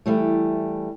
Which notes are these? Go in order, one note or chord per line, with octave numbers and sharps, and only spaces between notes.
E3 G3 A3